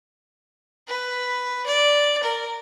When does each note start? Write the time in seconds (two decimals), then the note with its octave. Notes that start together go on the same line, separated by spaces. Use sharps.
0.88 B4
1.66 D5
2.23 A#4